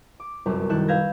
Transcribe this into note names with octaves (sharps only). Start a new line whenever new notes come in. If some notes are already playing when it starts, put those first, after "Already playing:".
D6
G1 C2 F#2
D#3 E4 A4 F#6 E7
B4 F5 E6 G6 G#6 A#6